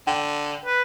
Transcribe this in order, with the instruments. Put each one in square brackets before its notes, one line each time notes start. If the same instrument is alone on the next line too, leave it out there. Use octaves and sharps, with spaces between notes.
[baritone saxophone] D3 [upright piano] G5
[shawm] B4